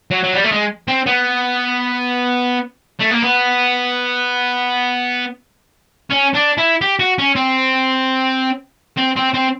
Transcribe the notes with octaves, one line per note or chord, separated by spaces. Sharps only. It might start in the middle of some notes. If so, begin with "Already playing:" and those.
F#3
F#3
G3
A3
G#3
C4
B3
A3
A#3
B3
C#4
D4
E4
G4
F#4
C#4
C4
C4
C4
C4